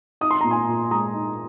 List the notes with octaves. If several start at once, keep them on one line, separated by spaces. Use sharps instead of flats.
D#4 D#6
C6
A#2 A#5
G#5 C6
A#2
G#3 A#5 D#6
D#4